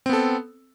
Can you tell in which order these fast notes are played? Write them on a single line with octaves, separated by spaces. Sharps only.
C4 B3 A4